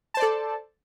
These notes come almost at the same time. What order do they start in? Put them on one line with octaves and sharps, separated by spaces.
A5 C5 D5 A4